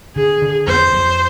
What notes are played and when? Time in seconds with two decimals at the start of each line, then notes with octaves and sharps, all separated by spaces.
0.16 D3 G#4
0.42 D3
0.67 F2 C5
0.93 F2